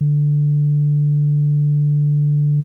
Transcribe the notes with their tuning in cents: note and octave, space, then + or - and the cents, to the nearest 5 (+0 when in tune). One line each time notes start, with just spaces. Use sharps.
D3 +0